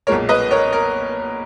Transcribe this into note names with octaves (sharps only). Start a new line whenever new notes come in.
B1 A#2 G#3 A#4 C#5
B4 D#5
A#4 C#5
A#4